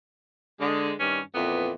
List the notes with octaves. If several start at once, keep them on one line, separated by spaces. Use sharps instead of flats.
D3 G#3
G2 D#3 G3 C#4
F2 A#2 E3 B3